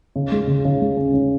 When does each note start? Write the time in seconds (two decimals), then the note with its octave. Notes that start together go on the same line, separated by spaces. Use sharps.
0.16 C#3
0.32 G#3
0.48 C#3
0.65 C#3
0.81 G#3
0.97 C#4
1.14 C#4